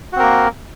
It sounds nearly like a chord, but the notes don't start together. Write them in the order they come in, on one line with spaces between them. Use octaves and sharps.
F#4 C4 A#4 A#3